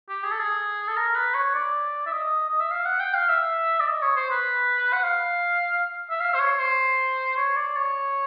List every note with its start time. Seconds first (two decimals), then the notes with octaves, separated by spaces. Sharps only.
0.09 G4
0.24 G#4
0.31 A4
0.39 G#4
0.88 A4
0.96 A#4
1.15 B4
1.35 C#5
1.55 D5
2.06 E5
2.12 D#5
2.49 D#5
2.60 E5
2.71 F5
2.85 F#5
3.00 G5
3.14 F5
3.29 E5
3.80 D5
3.87 D#5
4.02 C#5
4.16 C5
4.31 B4
4.93 F#5
5.03 F5
6.10 E5
6.20 F5
6.34 C5
6.40 C#5
6.59 C5
7.37 C#5
7.56 D5
7.76 C#5